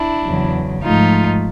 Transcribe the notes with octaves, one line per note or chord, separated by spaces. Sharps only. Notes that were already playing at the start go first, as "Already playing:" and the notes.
Already playing: D4 E4
E2 C#3 F#3
G#2 F3 A3 D#4 F4